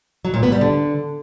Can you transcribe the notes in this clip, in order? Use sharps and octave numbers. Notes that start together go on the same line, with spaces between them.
F#3
A#2
B3
G3
D3